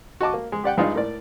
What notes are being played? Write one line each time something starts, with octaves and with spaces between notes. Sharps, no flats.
F#4 D#5 A5 D6
A#3
G#3
G4 D5 F#5 G5
G2 G#3 D#4 F4 D5 F5
A2 A#4 D5